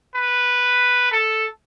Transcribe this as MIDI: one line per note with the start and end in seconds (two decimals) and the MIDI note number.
0.16 1.08 71
1.12 1.45 69